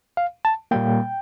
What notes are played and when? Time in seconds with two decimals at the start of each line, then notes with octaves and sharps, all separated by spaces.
0.17 F5
0.45 A5
0.71 A#2 G3 A#3 G5